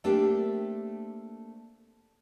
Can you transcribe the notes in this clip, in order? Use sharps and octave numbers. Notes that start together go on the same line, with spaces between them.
A3 A#3 C4 D4 G4